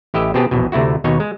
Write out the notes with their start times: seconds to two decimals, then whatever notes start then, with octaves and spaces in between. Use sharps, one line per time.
0.14 A1 E4 G4 D#5 E5
0.34 B2 B3 C4 G4 G#4 A5
0.51 A#1 E2 B2
0.72 D2 C3 A3 E4 F#4
1.04 D#2 B2 D#4 C#5
1.20 G#3